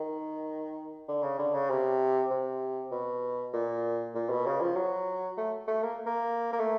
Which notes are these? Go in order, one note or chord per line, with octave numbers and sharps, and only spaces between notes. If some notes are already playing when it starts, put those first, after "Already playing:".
Already playing: D#3
D3
C#3
D3
C#3
C3
C3
B2
A#2
A#2
B2
C#3
F3
F#3
A3
A3
A#3
A#3
A#3
A3